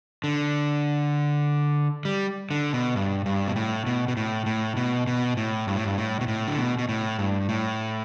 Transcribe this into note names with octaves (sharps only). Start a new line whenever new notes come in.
D3
G3
D3
B2
G2
G2
B2
A2
B2
B2
A2
A2
B2
B2
A2
G2
A2
G2
A2
B2
A2
D3
B2
B2
A2
G2
A2